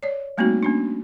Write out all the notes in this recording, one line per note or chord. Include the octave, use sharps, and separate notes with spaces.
C#5 D5
G3 A3 A#3 C4 D#4 F#4
A#3 C#4 D4